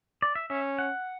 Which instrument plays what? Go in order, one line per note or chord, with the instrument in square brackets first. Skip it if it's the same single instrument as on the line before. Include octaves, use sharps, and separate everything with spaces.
[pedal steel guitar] D5
E5
[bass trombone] C#4 [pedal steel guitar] E5
[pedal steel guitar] F#5